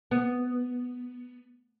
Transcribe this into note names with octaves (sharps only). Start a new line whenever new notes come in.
B3